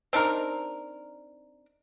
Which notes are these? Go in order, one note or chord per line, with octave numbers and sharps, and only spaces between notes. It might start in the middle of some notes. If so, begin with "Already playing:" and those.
C4 D4 D#4 A#4